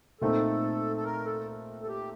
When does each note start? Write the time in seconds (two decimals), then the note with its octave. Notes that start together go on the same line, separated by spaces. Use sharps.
0.21 A#2 A3 C4 D#4 A4
0.96 A4
1.04 A#4
1.25 A4
1.82 A4
1.88 G4